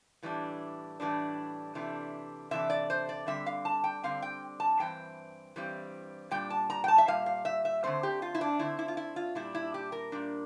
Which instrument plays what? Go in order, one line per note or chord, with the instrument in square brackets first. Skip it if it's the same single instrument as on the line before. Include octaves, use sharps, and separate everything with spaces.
[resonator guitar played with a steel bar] A2 E3 G3 D4
A2 E3 G3 D4
C3 E3 A3 D4
C3 E3 A3 D4 E5
D5
C5
D5
D3 G3 C4 E5
F5
A5
G5
D3 G3 C4 F5
G5
A5
G2 E3 C4 G5
G2 E3 G3 C4
A#2 G3 D4 G5
A5
A#5
G5
A5
E5
A#2 G3 F5
F5
E5
E5
D3 A3 C4 C5
G4
F4
E4
D4
D3 A3 C4 E4
E4
F4
E4
F4
A#2 G3 D4 E4
E4
G4
A#4
A#2 G3 D4